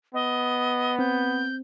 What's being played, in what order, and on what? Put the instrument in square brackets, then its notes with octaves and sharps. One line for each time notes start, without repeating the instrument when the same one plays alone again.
[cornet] B3 [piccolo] D#5
[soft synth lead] C4 [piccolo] G6